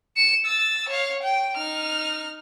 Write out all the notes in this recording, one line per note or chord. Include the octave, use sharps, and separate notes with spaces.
C#7 E7
E6 A6
C#5 F5
G5
D#4 F6